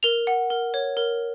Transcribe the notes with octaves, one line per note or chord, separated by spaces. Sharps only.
A#4 F7
F#5
A#4
C#5
A#4